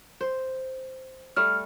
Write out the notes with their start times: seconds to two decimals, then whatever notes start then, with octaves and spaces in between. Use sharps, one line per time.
0.21 C5
1.36 G3 A3 F6